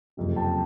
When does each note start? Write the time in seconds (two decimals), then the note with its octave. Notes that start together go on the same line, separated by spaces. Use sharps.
0.17 F#1 F2 C3
0.36 G5 A5